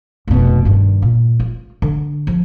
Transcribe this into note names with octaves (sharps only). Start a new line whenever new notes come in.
F1 B2
G2 D#3
A#2
F4
D3
F3